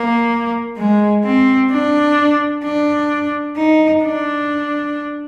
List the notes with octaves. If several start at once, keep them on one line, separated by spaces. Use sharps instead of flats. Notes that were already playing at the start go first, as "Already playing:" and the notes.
Already playing: A#3
G#3
C4
D4
D4
D#4
D4